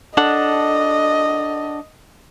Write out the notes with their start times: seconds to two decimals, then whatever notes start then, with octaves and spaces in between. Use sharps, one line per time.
0.17 D4 A4 D#5 F#5